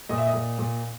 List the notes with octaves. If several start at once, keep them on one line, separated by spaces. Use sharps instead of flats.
A#2 D#5
E5
D#5
A#2
A#2